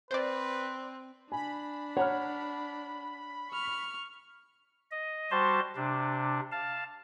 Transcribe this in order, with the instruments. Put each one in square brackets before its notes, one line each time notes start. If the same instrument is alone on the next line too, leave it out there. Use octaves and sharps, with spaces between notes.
[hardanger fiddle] C4 [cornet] B4 [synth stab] C5 D5
[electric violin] D4 [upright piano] G#5 [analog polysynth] B5
[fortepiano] C#5 [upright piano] F#5 A#5 F6
[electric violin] C#6 F6
[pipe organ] D#5
G3 F#4 C5 A5 C6
C3 D4
F5 A5